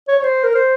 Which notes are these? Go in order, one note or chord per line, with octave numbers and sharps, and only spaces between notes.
C#5
C#5
C5
A#4
C5